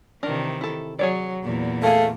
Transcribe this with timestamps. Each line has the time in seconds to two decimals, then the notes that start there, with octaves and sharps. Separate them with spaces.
0.23 C3 D#3 E3 D4 A#4
0.61 E4 A4
0.99 F#3 G#4 C#5 D5
1.44 E2 A#2 E3
1.83 A3 A#3 G#4 F5